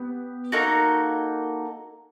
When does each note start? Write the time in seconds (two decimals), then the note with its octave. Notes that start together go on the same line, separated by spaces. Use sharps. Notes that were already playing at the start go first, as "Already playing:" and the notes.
Already playing: B3 G4
0.52 A#3 D#4 F#4 A4